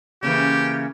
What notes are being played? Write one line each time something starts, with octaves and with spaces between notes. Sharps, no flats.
C#3 E3 A#3 G4